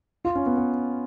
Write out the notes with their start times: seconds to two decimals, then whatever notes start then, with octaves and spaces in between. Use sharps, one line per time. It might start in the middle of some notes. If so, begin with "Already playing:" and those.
0.25 F4
0.36 C#4
0.46 B3
0.57 B3